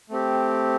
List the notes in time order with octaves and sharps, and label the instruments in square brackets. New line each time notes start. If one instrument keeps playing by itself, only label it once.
[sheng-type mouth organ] A3 C4 G4